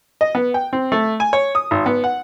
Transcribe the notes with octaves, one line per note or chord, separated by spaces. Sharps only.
D#5
B3
G5
C4
A3
G#5
C#5
D#6
G#1
B3
F#5